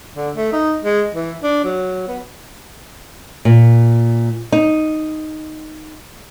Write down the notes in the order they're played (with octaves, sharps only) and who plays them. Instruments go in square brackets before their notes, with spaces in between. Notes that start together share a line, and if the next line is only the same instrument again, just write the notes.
[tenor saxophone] D3
A3
D#4
G#3
E3
D4
F#3
B3
[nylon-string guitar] A#2
D#4